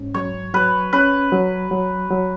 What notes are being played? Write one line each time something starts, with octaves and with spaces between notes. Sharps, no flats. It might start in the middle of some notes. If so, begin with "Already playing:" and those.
Already playing: G#2 C#4
F#3 C#5
F#3 B4
C#4 B4
F#3
F#3
F#3